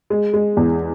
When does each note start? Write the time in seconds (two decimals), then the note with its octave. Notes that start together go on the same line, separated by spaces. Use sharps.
0.10 G#3
0.34 G#3
0.57 E2